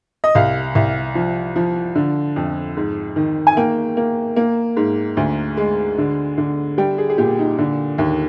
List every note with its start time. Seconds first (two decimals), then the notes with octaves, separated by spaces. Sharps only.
0.24 D#5
0.35 C2 F5
0.75 C2
1.15 F3
1.56 F3
1.95 D3
2.36 F2
2.77 G#2
3.16 D#3
3.47 G#5
3.57 A#3 G5
3.97 A#3
4.36 A#3
4.77 G#2
5.17 D2
5.57 G#3
5.98 D3
6.38 D3
6.78 G3 G5
6.98 G#4
7.10 G#4
7.18 A#2 G4
7.39 D#4
7.58 D3
7.98 D#2